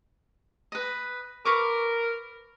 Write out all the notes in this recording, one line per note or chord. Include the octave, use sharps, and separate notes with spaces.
B4 D#5
A#4 B4 C#6 D6